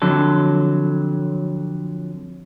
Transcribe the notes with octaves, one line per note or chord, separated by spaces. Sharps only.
F2 D3 F#3 A4